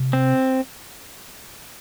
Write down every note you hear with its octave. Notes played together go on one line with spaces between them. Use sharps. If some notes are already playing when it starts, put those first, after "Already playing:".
Already playing: C3
C4